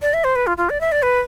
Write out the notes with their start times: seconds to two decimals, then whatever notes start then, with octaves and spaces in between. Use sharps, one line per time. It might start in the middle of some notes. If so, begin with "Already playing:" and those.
0.02 D5
0.14 E5
0.24 C5
0.36 B4
0.47 F4
0.57 F4
0.70 D5
0.81 E5
0.92 D5
1.02 B4